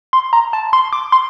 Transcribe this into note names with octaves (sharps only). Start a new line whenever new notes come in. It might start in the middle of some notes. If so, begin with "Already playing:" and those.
C6
A#5
A5
C6
D6
C6